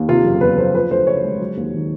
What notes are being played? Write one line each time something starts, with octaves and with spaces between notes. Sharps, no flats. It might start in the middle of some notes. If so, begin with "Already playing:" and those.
Already playing: D#2
C3 F4
F#1
E2 B4
F3 C5
F3 B4
D2 C5
C#3 C#5
G#3
F#3
D#2
D#3